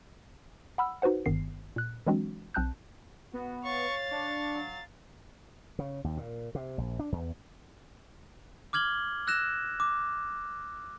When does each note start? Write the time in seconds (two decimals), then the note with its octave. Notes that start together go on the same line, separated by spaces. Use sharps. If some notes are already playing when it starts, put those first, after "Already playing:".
0.78 F#5 B5 E6 F6
1.02 D#4 F#4 B4 C5 F#5
1.26 G1 G2 D#3 B3 C7
1.76 A#2 F#6
2.07 E3 F#3 G#3 C4 D4 F#4
2.54 B1 C4 A5 F#6 G6
3.33 B3 F#4
3.65 C#5 F5 C#6 A6
4.11 D4 C#6
4.54 F#3
5.79 C#3
6.04 D#2
6.17 A#2
6.55 C3
6.78 A#1
6.99 D4
7.12 E2
8.73 D6 F6 G#6 F#7 G7
9.27 E6 F#6 A#6 E7
9.80 D6